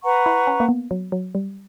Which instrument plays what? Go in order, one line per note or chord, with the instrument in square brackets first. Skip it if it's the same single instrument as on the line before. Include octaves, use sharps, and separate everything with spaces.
[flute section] B4 F#5 A#5 C#6
[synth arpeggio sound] E4
C#4
A#3
B3
F#3
F#3
G3